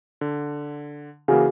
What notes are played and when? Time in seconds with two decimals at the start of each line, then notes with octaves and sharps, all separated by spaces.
0.21 D3
1.28 C#3 E3 A#3 F#4 G#4 F5